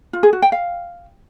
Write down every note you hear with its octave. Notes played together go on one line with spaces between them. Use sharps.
F4
G#4
F#4
G5
F5